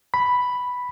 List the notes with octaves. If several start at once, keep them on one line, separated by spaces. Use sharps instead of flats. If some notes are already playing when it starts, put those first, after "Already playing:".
B5